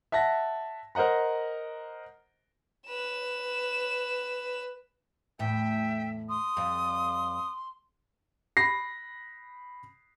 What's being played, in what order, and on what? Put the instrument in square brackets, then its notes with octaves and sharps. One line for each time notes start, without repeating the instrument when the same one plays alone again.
[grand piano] E5 F#5 A5 A#6
A#4 C5 D#5 F#5 A#5
[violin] B4 E7
[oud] E2 A2 [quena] E5 [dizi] G5
[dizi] C6 [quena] D#6
[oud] F2 G3
[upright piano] B5 A#6 C7